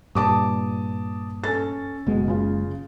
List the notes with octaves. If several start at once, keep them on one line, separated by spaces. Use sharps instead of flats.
G2 A#2 A5 D6 D#6
C#4 A4 A6
F#1 B2 G#3
C#3 F4